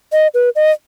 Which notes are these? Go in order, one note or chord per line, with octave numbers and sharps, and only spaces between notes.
D#5
B4
D#5